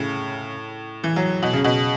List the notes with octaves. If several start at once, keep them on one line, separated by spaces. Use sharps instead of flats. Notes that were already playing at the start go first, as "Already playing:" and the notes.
Already playing: A2 C#3
E3
F#3
B2
C#3
B2